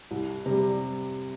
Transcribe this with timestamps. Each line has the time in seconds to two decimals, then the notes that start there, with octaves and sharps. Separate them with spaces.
0.11 C2
0.46 C3 G3